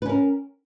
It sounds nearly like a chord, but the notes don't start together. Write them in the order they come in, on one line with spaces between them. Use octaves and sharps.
B4 C#4 A#4